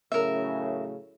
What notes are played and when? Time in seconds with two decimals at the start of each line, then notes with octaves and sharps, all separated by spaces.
0.12 F#2 A2 C#3 A#4 E5